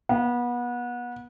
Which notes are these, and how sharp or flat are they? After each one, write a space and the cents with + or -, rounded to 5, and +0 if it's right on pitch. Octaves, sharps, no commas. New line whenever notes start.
B3 -30